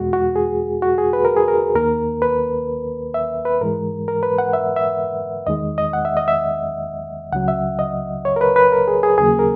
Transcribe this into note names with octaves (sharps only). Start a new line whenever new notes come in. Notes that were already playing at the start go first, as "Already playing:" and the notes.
Already playing: E2 B2 G#3 F#4
F#4
G#4
F#4
G#4
B4
A#4
G#4
A#4
D#2 D#3 A#3 A#4
B4
E5
B4
G#2 E3 G#3 A#4
A#4
B4
F#5
E5
E5
E2 D#3 G#3 D#5
D#5
F#5
E5
D#5
E5
C#2 C#3 F#3 F#5
E5
D#5
C#5
A#4
B4
B4
A#4
G#4
G#4
D#2 C#3 F#3 A#3 G#4
A#4